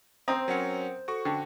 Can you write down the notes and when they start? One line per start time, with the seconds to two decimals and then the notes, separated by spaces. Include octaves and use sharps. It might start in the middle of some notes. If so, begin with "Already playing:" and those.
0.28 C4 C5 A#5 D#6
0.48 F#3 C#4 A#4 F#5 C#7
1.08 F#4 A4 C#6
1.25 D3 G5